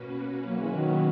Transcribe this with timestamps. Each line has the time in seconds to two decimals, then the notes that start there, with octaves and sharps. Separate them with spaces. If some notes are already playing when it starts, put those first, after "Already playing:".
Already playing: B2 A#3 C#4 F#4 B4
0.45 F#3 A#3
0.57 E3 G#3
0.71 D#3 F#3